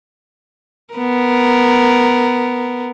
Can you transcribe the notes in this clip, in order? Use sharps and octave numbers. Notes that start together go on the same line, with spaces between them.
B3 A#4